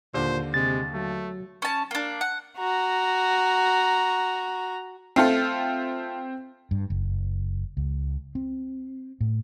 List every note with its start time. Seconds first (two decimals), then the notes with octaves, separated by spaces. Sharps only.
0.14 D#2 A#2 D3 C5
0.54 C3 G#3 A6
0.93 F#3 A3
1.62 C#4 A5
1.91 A#3 D4
2.21 F#5
2.58 F#4 A#5
5.16 A3 C4 F4 A4
6.71 G2
6.90 F#1
7.77 C#2
8.35 C4
9.21 A2